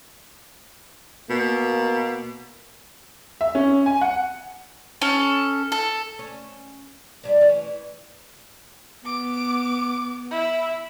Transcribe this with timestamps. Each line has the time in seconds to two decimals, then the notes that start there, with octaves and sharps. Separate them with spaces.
1.30 B2 A#3
3.41 E5
3.55 C#4
3.86 G#5
4.01 F#5
5.01 C#4 A4
5.72 A4
6.19 C#4
7.23 G2 G3 D4
7.41 E3 C#4
9.05 B3 D6
10.31 E4